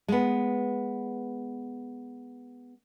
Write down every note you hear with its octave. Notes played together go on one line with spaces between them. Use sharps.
G#3 B3